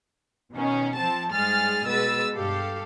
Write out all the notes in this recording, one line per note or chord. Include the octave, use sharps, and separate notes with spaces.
B2 D#3 C#4
F3 C4 A5
G#2 G3 G#3 G#4 F6 A6
B2 G#3 B4 E6 A6
G2 G4 A4 F5